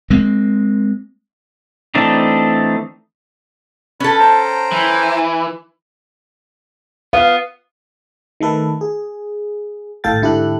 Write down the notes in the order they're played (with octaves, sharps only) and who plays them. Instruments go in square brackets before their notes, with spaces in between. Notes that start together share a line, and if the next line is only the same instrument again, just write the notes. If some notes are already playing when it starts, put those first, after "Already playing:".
[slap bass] G#3 A#3 C4
[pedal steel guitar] E3 A3 C4 D4 D#4
[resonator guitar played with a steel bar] C#4 A4 [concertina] B4 B5
[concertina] C5 G5 A#5
[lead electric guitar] E3
[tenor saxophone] B3 [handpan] F5
[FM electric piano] D#3 A3 A4 B4
G#4
G#1 A2 A4 F5 G5 A6
G#2 D3 E4 G4 A4 F#6